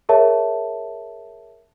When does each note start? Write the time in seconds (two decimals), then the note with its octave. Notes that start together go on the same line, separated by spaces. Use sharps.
0.09 G#4 A#4 C#5 E5 A5